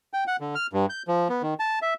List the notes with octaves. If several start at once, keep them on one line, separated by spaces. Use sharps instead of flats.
G5
F#5
D3
F6
G2
G6
F3
B3
D#3
A5
E5